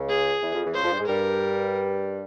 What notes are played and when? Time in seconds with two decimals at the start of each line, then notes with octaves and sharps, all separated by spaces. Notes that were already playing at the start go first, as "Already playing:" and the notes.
Already playing: C#2 C#3
0.09 G#4
0.42 E2 E3
0.53 F2 F3
0.64 E2 E3
0.74 C#2 C#3 C5
0.82 F2 F3
0.91 G2 G3
0.99 G#2 G#3
1.07 G2 G3 A#4